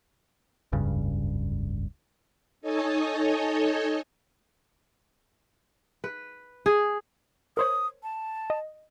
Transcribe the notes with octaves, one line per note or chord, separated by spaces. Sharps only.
F1 C#2 G2 C#3
D#4 A4 C#5 D#5 G#5 A5
B4
G#4
A#4 C5 C#5 D#6
A5
D#5